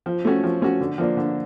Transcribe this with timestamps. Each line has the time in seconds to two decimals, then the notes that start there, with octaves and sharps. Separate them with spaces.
0.06 F3
0.25 A3 C#4 F#4
0.44 F3
0.62 A3 C#4 F#4
0.81 D3
0.98 F3 A#3 D4
1.17 D3